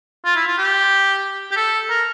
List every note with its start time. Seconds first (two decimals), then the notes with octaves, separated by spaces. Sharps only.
0.25 F4
0.36 E4
0.47 F4
0.58 G4
1.51 G4
1.56 A4
1.90 A#4